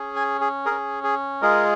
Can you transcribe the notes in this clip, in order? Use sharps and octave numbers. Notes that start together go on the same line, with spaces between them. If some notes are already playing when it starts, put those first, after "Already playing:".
Already playing: C#4 G#4
G#5
G#4
G#4 A#4
C#4
G#4
G#3 F4 G#4 A#4